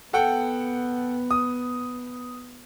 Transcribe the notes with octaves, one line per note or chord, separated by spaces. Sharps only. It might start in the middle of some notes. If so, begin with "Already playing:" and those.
B3 A4 F#5 G5
D#6